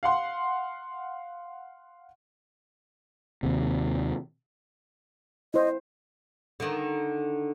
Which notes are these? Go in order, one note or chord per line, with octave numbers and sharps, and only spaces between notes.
F5 F#5 C6
D#2 C3
E4 C5 D#5
D3 D#3